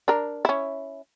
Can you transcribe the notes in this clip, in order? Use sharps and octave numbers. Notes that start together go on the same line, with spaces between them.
D4 A#4
C#4 E4